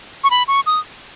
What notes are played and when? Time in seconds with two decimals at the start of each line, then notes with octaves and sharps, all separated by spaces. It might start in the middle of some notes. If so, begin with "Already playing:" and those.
0.24 C#6
0.31 B5
0.48 C#6
0.66 D#6